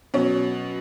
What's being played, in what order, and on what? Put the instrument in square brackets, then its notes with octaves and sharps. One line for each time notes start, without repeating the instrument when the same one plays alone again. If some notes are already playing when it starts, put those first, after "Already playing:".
[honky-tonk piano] B2 F#3 C#4